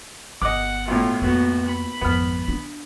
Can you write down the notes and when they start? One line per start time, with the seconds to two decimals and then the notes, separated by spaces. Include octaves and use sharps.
0.42 G1 D#5 F#5 D6
0.88 B1 A2 F4
1.22 F2 A#3 B3 F#4
1.65 B5
2.01 G#1 F2 B3 F6
2.48 D4